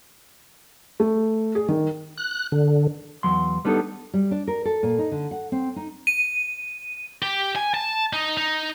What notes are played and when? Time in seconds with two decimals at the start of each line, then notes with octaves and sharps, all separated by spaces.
1.00 A3
1.55 G#4
1.69 D#3
2.18 F#6
2.52 D3
3.23 E2 F#3 C6
3.65 G3 B3 D4 D#4 A4
4.14 G3
4.31 D4
4.48 A#4
4.65 A4
4.83 A#2
4.99 D#4
5.12 D3
5.31 F#5
5.52 C4
5.76 D#4
6.07 D#7
7.22 G4
7.56 G#5
7.74 A5
8.13 D#4
8.37 D#4